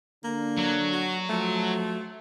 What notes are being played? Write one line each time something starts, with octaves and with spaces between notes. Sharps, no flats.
D3 A#3 D4
F#3
F#4
F3 A3 F#4